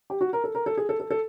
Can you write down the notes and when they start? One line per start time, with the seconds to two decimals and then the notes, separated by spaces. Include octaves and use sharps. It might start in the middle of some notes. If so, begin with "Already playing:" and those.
0.10 G4
0.21 F#4
0.33 A#4
0.44 A4
0.55 A#4
0.66 A4
0.77 G#4
0.89 A4
1.00 A4
1.10 A4